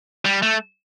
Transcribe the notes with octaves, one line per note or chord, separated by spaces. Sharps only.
G3
A3